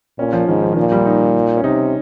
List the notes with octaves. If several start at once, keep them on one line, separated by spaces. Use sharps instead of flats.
A#2 C#4
F3
G#2 D#3
F3
D#3
A#2 F3
G3
D#4
C#4
C3 D#4